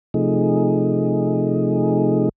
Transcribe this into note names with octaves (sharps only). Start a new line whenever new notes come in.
C3 F3 A3 D#4 G#4